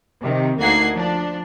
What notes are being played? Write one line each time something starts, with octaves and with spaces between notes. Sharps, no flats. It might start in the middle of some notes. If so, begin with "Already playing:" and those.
C3 D#3
D2 A#3 D#4 F#5 G#6 C7
F3 D4